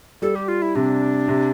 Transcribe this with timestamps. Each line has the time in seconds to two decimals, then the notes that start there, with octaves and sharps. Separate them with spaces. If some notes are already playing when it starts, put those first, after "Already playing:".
0.22 G3 A4
0.35 G4
0.48 F4
0.62 E4
0.75 C3 D4
1.28 C3